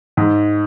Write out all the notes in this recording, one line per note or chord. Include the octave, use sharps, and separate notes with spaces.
G#2